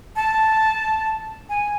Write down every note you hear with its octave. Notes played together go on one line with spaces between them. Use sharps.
A5
G#5